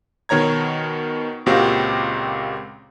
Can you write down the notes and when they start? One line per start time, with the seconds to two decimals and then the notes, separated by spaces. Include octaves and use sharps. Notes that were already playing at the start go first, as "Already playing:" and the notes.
0.29 B2 D#3 C#5 A#5 G#6
1.46 C#2 A#2 C4 F#4 G4 F5